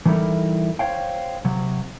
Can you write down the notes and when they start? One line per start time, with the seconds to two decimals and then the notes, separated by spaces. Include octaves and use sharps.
0.06 E3 G3 D#4 E4 A4 A#4
0.79 C5 C#5 F5 G5
1.45 C3 F#3